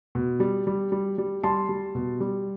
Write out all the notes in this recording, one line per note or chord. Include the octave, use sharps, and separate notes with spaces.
B2
G3
G3
G3
G3
G3 A5 C6
G3
B2
G3